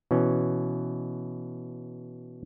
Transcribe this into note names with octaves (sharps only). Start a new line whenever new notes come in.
B2 E3 C#4